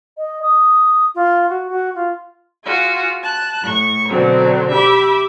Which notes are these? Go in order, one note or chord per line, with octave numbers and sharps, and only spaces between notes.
D#5
D#6
F4
F#4
F#4
F4
F4 F#4 G#4
A5 F#6
A2 C#6
B2 D3 F#3 C4 D4
G4 E5 B5 D6